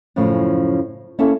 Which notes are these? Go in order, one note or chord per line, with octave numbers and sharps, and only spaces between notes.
F#2 A2 C#3 F3
A#3 C#4 E4 G#4 A4 E5